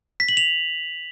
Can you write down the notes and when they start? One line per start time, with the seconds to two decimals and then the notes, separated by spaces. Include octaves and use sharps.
0.20 B6
0.29 F#7
0.37 F7